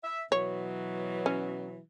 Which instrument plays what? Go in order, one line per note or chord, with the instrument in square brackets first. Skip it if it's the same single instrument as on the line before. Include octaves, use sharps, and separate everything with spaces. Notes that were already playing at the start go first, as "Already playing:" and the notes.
[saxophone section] E5
[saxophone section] B2 E3 F#3 [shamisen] C#5
[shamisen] C#4